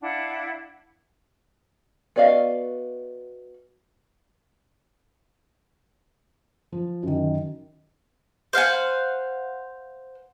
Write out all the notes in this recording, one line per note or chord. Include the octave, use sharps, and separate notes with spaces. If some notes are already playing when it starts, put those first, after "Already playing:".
D4 E4 F5 F#5
B3 F#4 D5 D#5 F5
F3
F#2 D#3
C5 F5 F#5 G#5